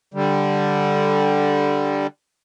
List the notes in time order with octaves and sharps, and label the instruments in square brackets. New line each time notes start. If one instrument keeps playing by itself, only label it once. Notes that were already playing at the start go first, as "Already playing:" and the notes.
[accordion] D3 G3